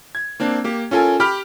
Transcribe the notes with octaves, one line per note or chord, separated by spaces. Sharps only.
G#6
A#3 C4 D4
A#3 G4
C#4 F4 A4 A#4 G#5
G4 G5 B5 F6